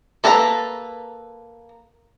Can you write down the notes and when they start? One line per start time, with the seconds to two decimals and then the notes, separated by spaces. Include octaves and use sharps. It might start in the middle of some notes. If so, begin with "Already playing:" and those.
0.24 A#3 A4 B4 D5 A#5